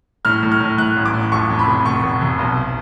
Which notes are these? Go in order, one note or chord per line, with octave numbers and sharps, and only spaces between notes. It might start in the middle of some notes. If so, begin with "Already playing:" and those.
A2 F6
A2
F6
A2
A2 F#6
A1
D6
A2
F2 C#6
F2
B5
F1
F1 C#6
F1
F1
B1